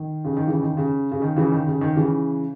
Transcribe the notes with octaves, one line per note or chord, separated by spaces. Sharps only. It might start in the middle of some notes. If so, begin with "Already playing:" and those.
Already playing: D#3
C#3
D#3
C#3 E3
D#3
C#3
C#3
D#3
C#3 E3
D#3
C#3
D#3
C#3 E3